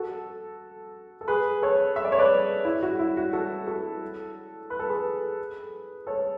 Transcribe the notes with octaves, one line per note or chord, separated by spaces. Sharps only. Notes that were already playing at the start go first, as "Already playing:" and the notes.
Already playing: F#4 A4
A4
G#4 B4
A4 C#5
E5
D5
C#5
B4 D5
E4
F#4
E4
F#4
F#4 A4
F#4 A4
B4
A4
G#4 B4
A4 C#5